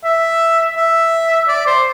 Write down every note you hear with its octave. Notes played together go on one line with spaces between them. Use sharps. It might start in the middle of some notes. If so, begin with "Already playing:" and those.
E5
E5
D5
C5